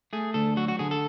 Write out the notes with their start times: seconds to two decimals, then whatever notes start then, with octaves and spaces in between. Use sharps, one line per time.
0.13 A3 G#4
0.34 D2 A4
0.57 F#3 F#4
0.68 F#4
0.79 D3 G#4
0.91 A4